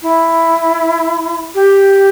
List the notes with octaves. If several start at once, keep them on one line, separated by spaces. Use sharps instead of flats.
E4
G4